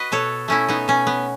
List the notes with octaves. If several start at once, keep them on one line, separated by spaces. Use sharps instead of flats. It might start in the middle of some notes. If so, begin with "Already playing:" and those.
Already playing: F#4 B4 D#5
B2 A4 C#5
A3 C#4 E4
B3 D#4
B2 C#4
B3